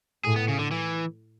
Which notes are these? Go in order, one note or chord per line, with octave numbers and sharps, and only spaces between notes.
A2 G#4
B3
C#3
D3
E3